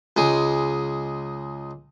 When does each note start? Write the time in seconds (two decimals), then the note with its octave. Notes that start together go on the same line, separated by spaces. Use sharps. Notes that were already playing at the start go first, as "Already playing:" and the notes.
0.17 C#2 G#3 G#4